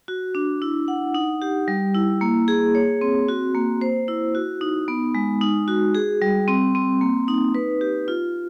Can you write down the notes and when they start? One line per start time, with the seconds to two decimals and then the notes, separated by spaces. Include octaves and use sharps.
0.08 F#4
0.35 D4
0.62 E4
0.88 F#5
1.14 D#4
1.42 G4
1.68 G3
1.94 E4
2.21 A#3
2.48 G#4
2.75 C#5
3.01 C4
3.28 F#4
3.55 A#3
3.81 C5
4.08 E4
4.35 F#4
4.61 D#4
4.88 B3
5.15 G#3
5.41 D#4
5.68 F#4
5.95 G#4
6.22 G3
6.48 C4
6.75 C4
7.01 A#3
7.28 D#4
7.55 B4
7.81 G4
8.08 F4